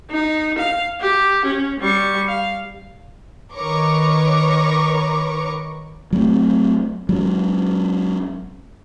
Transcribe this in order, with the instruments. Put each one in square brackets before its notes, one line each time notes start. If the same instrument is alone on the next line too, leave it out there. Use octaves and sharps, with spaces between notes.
[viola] D#4
F5
G4
C#4
G3 C#6
F5
[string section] D#3 A#4 B4 C#5 C#6 D6
[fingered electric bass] F#3 A3 C4
F#3 G#3 C#4